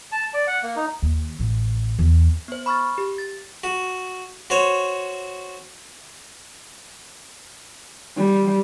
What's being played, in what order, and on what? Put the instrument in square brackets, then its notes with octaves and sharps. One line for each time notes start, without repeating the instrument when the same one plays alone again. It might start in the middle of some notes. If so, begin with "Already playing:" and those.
[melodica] A5
D5
F#5
A#3
D#4
[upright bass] D#2
A1
E2
[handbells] B3 C5
B5 C#6 F6 A6
G4
A6
[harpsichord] F#4
F#4 C5 C#5
[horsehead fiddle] G3